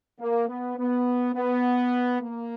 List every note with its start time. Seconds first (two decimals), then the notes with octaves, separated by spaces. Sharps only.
0.20 A#3
0.49 B3
0.78 B3
1.35 B3
2.22 A#3